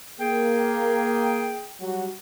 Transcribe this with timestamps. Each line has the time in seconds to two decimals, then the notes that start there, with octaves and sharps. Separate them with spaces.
0.20 A#3 G#4 G5
1.81 F#3 G3 F#4